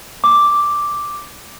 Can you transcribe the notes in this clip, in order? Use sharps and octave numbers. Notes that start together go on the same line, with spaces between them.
D6